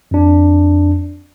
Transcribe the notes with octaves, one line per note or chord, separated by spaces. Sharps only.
F2 D4